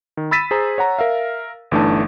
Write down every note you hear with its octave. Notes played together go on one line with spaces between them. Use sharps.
D#3
B5 E6 A6 B6 D#7 E7
G#4 C5 A#5
C#5 F#5 A#5
A#4 E5 F5
G1 E3 A3 D4 D#4 A5